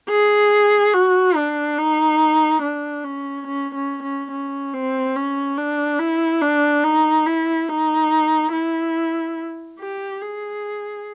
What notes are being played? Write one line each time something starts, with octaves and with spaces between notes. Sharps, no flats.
G#4
F#4
D4
D#4
D4
C#4
C#4
C#4
C#4
C#4
C4
C#4
D4
E4
D4
D#4
E4
D#4
E4
G4
G#4